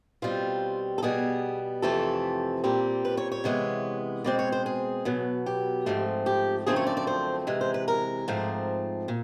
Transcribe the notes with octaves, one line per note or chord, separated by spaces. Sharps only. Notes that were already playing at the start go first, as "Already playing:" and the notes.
B2 G3 C4 F4
A4
B2 G3 B3 G#4
F2 C3 E3 A3 C4 A4
A#2 G3 C4
B4
C#5
C#5
C3 E3 G#3 B3
B2 G#3 C4 D5
C#5
C5
G#4
B2 F#3 B3
G4
G#2 F3 A3 C4
G4
F#2 D3 F3 A3 C4 G#4
C#5
D5
D5
C5
C3 E3 G#3 B4
C5
B4
A#4
G#2 F3 A3 C4
A#2